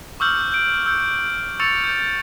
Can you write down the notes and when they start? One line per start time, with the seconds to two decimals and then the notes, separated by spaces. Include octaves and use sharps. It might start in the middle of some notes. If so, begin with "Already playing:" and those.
0.20 C#6 D6 E6 F6 G6 F#7
0.50 E6 G6 D7
0.86 E6 G6
1.60 C#6 E6 A6 C#7 F7
1.84 G6